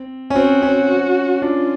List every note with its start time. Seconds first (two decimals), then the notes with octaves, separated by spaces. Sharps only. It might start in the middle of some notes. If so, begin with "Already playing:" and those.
Already playing: C4
0.30 C#4
0.35 C4 F#4
0.62 C#4
1.42 D4 F4